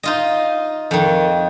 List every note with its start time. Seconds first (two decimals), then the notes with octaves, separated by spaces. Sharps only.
0.03 D#4 F4 D#5
0.91 F2 D#3